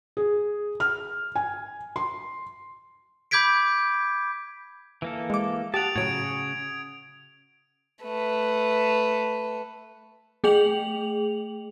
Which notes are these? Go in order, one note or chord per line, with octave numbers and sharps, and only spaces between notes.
G#4
F6
G#5
C6
B5 D6 G6 G#6 B6 D7
E3 A#3 A4
G#3 D6
G4 F#5 A5 D#6 D7 F7
A2 C#3 F#3 F#4 G#6 D7
A3 B4
A3 G#4 G5 F7 F#7